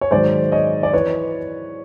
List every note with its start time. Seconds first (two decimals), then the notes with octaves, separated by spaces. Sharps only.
0.01 C#5
0.11 G#2 D#3 F#3 C5 D5
0.52 C#5 D#5
0.83 D5
0.93 E3 B4 C#5